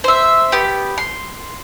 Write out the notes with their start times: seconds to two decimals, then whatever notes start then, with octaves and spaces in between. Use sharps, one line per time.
0.04 C5 E5
0.52 B3 G4
0.98 C6